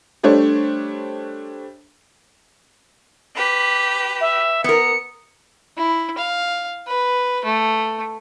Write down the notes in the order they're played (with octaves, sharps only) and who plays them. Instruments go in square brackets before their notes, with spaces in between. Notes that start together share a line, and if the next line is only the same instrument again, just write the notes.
[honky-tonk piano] G3 A3 D4 C5 C#5
[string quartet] G4 B4
[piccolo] E5
[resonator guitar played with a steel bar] B3 A#4 [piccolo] C#7
[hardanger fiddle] E4
F5
B4
A3